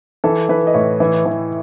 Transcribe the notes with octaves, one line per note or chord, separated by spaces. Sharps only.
E3 A4
E3 B4
D#5
A2 C#5
E3
E3